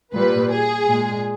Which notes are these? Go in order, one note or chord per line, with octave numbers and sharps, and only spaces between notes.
A#2 G3 B4
G#4
A#2 G#3